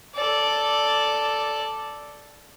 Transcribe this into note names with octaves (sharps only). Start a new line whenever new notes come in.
A4 D5